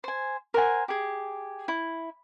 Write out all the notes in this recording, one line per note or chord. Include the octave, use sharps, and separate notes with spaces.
C5 G#5
A#4 C5 F#5 G#5
G4 G#4
E4